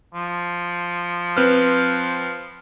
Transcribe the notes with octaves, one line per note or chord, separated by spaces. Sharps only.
F3
C4 B4 F6